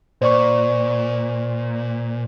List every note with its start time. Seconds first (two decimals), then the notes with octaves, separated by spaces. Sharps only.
0.22 A#2 C5 D5 C#6